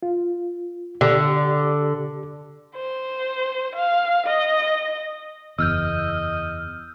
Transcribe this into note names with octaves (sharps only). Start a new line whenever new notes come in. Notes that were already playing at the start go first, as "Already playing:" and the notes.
F4
D3 G4 D5
C5
F5
D#5
F#1 E2 D#5 E6 F6 G6